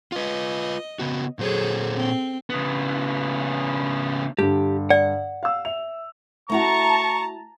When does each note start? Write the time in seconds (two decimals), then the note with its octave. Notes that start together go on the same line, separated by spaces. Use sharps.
0.12 F4 B4 D#5
0.99 C#3 B3 F#4
1.39 A#2 F#3 G#4 A4 C5 C#5
1.95 C4
2.50 C#3 B3
4.39 G2 D3 G4
4.90 D5 F#5
5.43 F5 E6
5.65 E5 F7
6.50 A3 E4 F#4 A5 A#5 C#6